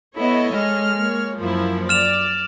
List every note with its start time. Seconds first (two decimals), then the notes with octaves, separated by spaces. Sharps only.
0.15 B3 E4 A4 C#5 D#5
0.52 G#3 F6
0.97 A#3 C#5
1.39 F#2 F3 A#3 E4
1.89 D5 F6 E7 F7